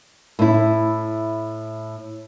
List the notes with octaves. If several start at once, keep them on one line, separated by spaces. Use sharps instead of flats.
A2 E4